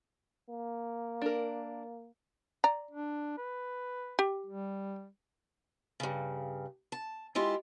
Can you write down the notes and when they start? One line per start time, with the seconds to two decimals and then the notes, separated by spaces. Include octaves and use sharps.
0.49 A#3
1.22 D4 A#4
2.64 D5 A#5
2.91 D4
3.38 B4
4.19 G4
4.46 G3
6.00 G2 C#3
6.92 A5
7.35 G#3 E4 F4 G4